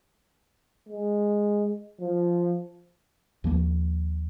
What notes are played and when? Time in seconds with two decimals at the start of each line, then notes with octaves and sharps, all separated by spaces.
0.89 G#3
2.00 F3
3.44 D#2 F3 A#3